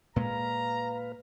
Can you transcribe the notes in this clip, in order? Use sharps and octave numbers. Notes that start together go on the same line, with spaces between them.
A#2 G#3 B4 F5 A#5